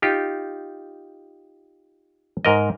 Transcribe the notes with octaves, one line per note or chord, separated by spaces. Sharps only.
D#4 F4 G4
G#2 A#4 D#5